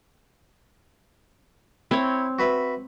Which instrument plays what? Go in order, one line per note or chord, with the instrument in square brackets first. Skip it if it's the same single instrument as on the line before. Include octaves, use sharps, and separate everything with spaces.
[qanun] C4 C#5 [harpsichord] E4
[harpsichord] F#4 B4 E5